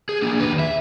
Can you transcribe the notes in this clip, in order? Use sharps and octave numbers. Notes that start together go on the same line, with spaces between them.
G#4
A#3 D4
D#2 B4
E5